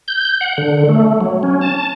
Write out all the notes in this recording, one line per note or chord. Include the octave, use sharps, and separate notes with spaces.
G6
F#5
D3
A3
F#3
C#4
A5